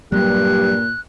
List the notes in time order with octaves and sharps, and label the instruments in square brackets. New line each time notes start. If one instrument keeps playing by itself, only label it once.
[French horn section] G2 G4 [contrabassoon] A#2 [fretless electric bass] F#3 G3 [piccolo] F#6